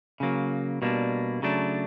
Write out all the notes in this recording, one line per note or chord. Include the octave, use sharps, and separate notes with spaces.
C#3 F#3 A#3
B2 G3 A#3 D4
C#3 F#3 A3 D4